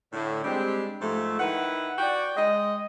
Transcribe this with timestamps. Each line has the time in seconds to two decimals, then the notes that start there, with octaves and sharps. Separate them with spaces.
0.13 A2 D3
0.44 G3 G#3 C4 D4 G4
1.02 G#2 F3 A3
1.39 D#3 E4 B4 F#5
1.98 F#4 D5 G5
2.37 G#3 D#5